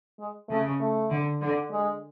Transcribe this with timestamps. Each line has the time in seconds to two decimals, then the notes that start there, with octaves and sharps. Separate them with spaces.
0.20 G#3
0.50 C#3 A3
0.81 A3
1.10 D3
1.41 D3
1.71 G#3